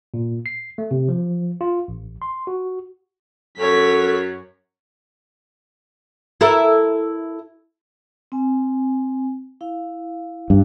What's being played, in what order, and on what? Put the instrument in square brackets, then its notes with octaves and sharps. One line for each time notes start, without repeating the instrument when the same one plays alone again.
[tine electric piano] A#2
C7
A3
C3
F3
F4
A1
C6
F#4
[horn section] F#2 [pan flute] A4 [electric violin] C#5 B6
[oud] E4 A4 A#4
[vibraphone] C4 G#5
E4 F5
[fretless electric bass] G2